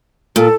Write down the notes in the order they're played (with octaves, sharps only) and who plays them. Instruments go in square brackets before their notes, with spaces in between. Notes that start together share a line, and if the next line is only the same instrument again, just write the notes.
[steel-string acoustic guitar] A#2 [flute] A4